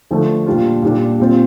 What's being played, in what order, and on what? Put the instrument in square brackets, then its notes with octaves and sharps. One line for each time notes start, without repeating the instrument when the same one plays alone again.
[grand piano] D3 F3 A3 D4
A#2 G3 D4 F4
A#2 G3 D4
A#2 G3 C4 F4